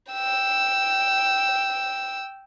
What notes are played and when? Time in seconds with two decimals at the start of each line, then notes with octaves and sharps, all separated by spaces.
0.12 G5 E6